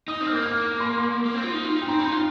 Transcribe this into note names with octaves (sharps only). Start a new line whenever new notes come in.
D#4 D#6
C4
F6
A#3 G6
F6
C6
C6
A#3
C4
F4
D#4
F4
D#4
G5
C4 A#5
D#4 C6
F4 G5